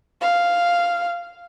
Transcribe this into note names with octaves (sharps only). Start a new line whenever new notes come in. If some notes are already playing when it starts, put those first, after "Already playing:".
F5